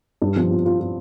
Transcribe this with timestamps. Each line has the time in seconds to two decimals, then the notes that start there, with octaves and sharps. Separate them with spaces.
0.22 G2
0.36 F3
0.50 F4
0.65 F4
0.80 F4